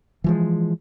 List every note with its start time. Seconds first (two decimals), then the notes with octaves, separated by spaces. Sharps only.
0.24 E3 F3 G#3